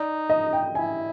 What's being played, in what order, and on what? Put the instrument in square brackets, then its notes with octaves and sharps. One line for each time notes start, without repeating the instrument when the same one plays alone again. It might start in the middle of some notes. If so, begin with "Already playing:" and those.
Already playing: [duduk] D#4 [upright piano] D5
[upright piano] D#5
G5
[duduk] E4 [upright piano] G#5